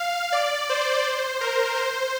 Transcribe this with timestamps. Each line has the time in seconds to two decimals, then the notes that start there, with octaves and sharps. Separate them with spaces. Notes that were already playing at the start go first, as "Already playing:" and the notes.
Already playing: F5
0.32 D5
0.70 C5
1.41 A#4
1.77 C5